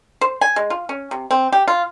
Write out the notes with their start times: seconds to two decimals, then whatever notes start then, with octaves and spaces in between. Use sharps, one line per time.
0.21 C5
0.41 G#5
0.56 G#3
0.70 F4
0.89 C#4
1.11 C3
1.31 C4
1.52 G4
1.68 F4